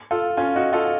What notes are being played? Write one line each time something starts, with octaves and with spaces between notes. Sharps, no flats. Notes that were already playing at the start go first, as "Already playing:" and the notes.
F4 A4
C#4 F4
D#4 F#4
F4 A4